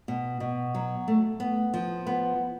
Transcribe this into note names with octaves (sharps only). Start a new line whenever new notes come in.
B2
B2
F#3
A3
B3
F3
B3